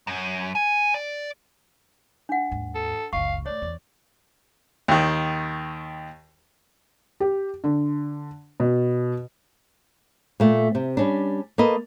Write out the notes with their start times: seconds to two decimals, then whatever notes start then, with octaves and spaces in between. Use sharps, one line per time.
0.07 F#2
0.55 G#5
0.94 D5
2.29 D4 F#5
2.51 D#2 G#2
2.75 A4
3.13 F#1 C#2 F5 C#6
3.46 F#2 A3 C#5 D5
3.62 E2
4.88 D#2 D#3
7.20 G4
7.64 D3
8.60 B2
10.40 A#2 A3
10.75 C3
10.97 G3 C#4 D4
11.58 A#3 A4 B4 D#5